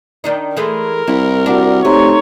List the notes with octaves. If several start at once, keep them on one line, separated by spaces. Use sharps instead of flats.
D#3 D4 D#4
E3 G#3 A3 A#4
C2 E4
D4 F#4 F#5 D6
C3 A3 D#4 C#5 A#5 C6